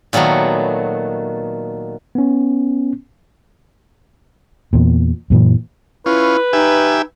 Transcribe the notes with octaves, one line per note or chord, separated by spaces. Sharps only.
A#2 D#3 F#3 A3 B3
B3 C#4
E2 A#2
F#2 A#2 E3
C#4 E4 F4 B4
D#4 G4 E5 G#5